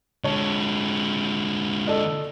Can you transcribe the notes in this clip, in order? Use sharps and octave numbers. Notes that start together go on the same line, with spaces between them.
D3 G#3 C#5 A5
A4 D5 D#5